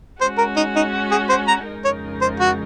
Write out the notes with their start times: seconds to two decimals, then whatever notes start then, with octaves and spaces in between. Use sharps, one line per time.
0.21 G#3 C#4 F#4 C5
0.38 A#4
0.56 D#4
0.76 D#4
1.11 G#4
1.29 C5
1.48 A#5
1.66 F2 C#3 G#3 D#4 A#4
1.85 C#5
2.21 C5
2.40 F#4